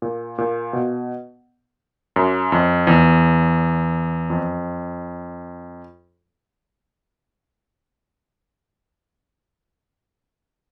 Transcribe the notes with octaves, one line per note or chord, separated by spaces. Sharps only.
A#2
A#2
B2
F#2
F2
E2
F2